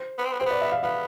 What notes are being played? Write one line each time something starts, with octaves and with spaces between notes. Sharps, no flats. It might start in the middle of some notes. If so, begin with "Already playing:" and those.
Already playing: C5
B3
C4
B3
C4 C5
B3 D5
E5
F5
B3 F5